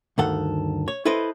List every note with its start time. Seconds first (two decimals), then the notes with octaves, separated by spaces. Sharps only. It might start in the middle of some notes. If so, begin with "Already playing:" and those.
0.18 D2 G2 D#3 A4 F#5
0.88 C#5
1.05 E4 A4 B4 C5 D#5